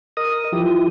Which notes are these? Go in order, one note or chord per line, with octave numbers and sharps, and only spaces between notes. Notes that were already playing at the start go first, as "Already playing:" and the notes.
A#4 D#5 D#6
F3 E4 G4